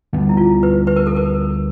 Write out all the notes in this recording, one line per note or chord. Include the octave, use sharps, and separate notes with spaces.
D2 D3 G3 B3
E4
F4
B4
B4
A#4
A4
A#4